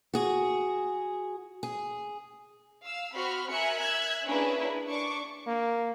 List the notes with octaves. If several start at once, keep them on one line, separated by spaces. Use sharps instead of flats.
F#4 G#4
G#4
F5 E6
C4 F#4 B5 F6
A#4 E5 G#5 F#6 C#7
E5 E6 F#6 G#6
A#3 C#4 D4 E4 G#4 B4
D4 C#6 D6
A#3